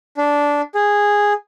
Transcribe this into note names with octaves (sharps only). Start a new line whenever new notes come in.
D4
G#4